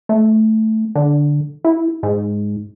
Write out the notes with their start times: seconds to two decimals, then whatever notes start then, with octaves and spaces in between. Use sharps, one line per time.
0.09 A3
0.95 D3
1.64 E4
2.03 G#2